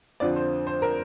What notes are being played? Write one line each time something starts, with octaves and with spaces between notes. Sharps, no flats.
F2 D3 F3 D5
C5
C5
A#4